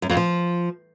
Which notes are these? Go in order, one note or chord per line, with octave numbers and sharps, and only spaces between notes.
F#2
F2
F3